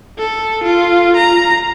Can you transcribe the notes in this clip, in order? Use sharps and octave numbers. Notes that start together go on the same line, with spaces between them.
A4
F4
A#5